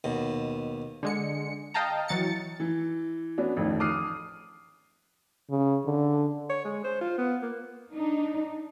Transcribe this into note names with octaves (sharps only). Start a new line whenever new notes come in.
D#2 B2
D3 G#3 C#7
D#5 F5 G5 A5 A#5
E3 F#3 A6 C#7
E3
B3 C#4 D4 F#4
A1 F2 D#3
D6 D#6 F6 F#6 C7 D#7
C#3
D3
C#5
G#3
C5
F4
B3
A#3
D4 D#4